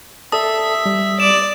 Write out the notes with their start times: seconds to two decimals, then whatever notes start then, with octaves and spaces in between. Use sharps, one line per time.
0.32 A4 D5 E5 A5 D#6
0.86 G3
1.20 D5 E7